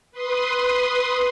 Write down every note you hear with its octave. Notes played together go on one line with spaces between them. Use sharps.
B4 C6 D#6